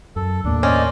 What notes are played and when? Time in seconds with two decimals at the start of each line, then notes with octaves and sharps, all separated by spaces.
0.16 F#2 A4
0.45 D#2 A2 A#3 D4
0.63 C#4 C5 D5 D#5